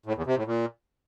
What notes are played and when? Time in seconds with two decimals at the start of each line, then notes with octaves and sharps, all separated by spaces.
0.06 A2
0.16 E2
0.26 C3
0.36 A2
0.47 A#2